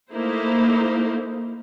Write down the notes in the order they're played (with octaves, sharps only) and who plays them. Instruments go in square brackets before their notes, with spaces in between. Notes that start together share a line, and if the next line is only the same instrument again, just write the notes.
[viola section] A3 A#3 D#4 E4 C5